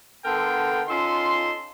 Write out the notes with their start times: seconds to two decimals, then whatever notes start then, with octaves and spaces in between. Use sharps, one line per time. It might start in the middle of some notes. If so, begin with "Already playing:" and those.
0.25 D3 B3 A4 A#4 G5 C6
0.88 C#4 D#4 F4 A4 C6